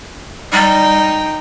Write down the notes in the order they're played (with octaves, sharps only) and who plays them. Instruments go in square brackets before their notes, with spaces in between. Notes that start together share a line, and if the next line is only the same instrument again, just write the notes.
[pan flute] G3 [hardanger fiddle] D#4 G5